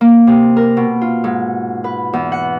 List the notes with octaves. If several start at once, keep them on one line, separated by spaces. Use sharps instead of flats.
A#3
C3
A#4
B2
F4
G#2
B4
E2
F#5